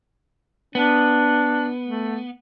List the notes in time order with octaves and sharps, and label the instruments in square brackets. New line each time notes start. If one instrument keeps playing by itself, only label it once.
[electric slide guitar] B3 [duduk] D4
[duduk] A3